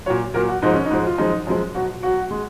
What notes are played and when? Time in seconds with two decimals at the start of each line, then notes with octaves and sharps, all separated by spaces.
0.06 F#3 C#5
0.10 A#2
0.34 A#2 F#3 A#4
0.48 F#4
0.62 G#2 F3 G#3 D#4
0.74 C#4
0.86 D#4
0.91 G#2 F3 G#3
1.07 F4
1.18 F#2 F3 G#3 D#4
1.47 F#2 F3 G#3
1.75 B2 F#3 F#4
2.03 B2 F#3 F#4
2.31 G#3